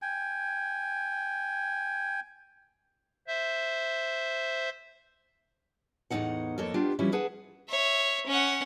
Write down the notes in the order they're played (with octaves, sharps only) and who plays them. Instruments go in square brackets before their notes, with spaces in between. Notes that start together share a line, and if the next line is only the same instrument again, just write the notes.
[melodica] G5 G#5
[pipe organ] C5 E5
[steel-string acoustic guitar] E2 A2 F#3 C#4 D#4 F#5
F2 A#3 A4 C#5
G3 B3 D4 F4 G4
E3 F3 G3 C#4 E4
G#4 B4 F#5 A5
[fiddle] C#5 E5
C#4 F#5